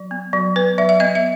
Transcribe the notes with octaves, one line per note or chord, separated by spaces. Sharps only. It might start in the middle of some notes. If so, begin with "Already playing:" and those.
Already playing: F#3
B3
F#3
B3 B4
F#3 E5
E5
B3 D#5
E5